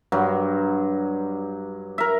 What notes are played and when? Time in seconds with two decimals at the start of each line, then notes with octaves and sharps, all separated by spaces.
0.12 G2 F#3
1.98 A#4 E5